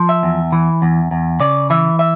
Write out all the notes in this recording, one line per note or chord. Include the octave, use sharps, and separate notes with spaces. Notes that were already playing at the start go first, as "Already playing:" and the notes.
Already playing: F3
E5
E2
E3
E2
E2
C#3 D5
E3 E5
E5